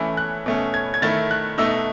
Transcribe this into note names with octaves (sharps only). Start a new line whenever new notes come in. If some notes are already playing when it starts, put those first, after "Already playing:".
Already playing: E3 A3 C#4 E4
F#6
B2 A3 C#4
G#6
G#6
D#3 A3 E4 A6
F#6
B2 A3 D#4 E6